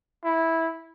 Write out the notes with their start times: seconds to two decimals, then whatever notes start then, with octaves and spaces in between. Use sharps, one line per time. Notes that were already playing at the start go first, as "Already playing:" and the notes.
0.24 E4